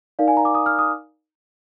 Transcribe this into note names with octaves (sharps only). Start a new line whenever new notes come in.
D#4 A#4 D5 F5
G#5
A#5
D6
D#6
F6
D#6